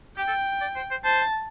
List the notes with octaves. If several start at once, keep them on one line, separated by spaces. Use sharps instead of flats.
G4 G5
A4
D5
C5
C5
C5 A5